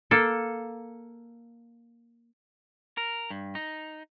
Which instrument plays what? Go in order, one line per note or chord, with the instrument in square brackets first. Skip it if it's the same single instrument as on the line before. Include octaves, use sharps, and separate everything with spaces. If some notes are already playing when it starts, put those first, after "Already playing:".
[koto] A#3 A4
[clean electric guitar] A#4
G2
D#4